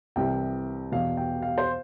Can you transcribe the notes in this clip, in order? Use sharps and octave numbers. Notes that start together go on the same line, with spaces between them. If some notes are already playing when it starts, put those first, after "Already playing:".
C2 C3 E3 G5
E2 B2 F5
G5
F5
C5